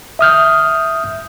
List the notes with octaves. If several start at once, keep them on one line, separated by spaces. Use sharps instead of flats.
E5 D#6 F6 G6